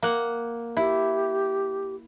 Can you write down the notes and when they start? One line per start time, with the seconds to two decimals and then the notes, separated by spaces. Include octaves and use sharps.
0.03 A#3 F#5
0.77 E4 G4